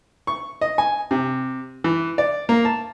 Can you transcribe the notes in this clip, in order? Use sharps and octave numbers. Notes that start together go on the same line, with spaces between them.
C#6
D#5
G#5
C3
E3
D5
A#3
A5